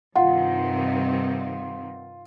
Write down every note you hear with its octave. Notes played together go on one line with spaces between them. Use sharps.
G2 C3 D#3 F4 F#5